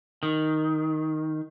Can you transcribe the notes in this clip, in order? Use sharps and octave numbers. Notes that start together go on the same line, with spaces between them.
D#3